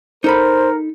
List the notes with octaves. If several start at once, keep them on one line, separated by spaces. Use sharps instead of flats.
D#4 A4 A#4 C5 B5